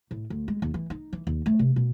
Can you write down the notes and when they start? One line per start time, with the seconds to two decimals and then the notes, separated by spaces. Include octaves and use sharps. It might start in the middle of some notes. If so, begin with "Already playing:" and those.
0.11 A2
0.30 D2
0.48 G#3
0.62 D#2
0.74 E3
0.90 D#4
1.13 E3
1.27 D#2
1.46 A3
1.59 C3
1.76 B2